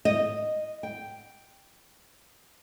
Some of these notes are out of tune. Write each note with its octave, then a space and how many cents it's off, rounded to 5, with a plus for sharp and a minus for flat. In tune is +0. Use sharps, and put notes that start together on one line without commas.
D#5 -10
G5 +0